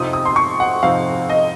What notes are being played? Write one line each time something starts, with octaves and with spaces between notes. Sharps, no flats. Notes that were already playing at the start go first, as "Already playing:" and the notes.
Already playing: F2 C3 F3 C4 D#4 D#6
D#6
C6
C#6
F#5
F2 C3 F3 C4 D#4 F5
D#5